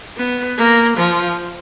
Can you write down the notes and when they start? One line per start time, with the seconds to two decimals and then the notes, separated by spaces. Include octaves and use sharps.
0.17 B3
0.58 A#3
0.97 F3